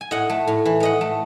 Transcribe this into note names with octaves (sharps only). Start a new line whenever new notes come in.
G#5
A2 D#5 F#5
A3
A2
E3
A2 D#5 F#5
A3